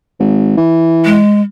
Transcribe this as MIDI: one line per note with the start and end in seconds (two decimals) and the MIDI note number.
0.20 0.54 32
0.57 1.20 52
1.05 1.41 56